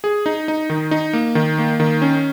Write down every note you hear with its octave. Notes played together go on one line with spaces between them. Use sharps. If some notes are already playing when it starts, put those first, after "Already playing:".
G#4
D#4
D#4
D#3
D#4
A#3
D#3
A#3
D#3
C#4